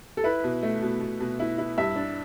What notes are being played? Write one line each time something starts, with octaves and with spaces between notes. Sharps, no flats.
A4
E4 B4
B2
A3
B2
B2
B2
E4
E4
G2 E5
D4